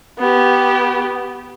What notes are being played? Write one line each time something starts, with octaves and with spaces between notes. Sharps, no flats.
B3 G4